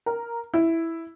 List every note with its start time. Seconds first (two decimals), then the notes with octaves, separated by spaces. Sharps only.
0.06 A#4
0.54 E4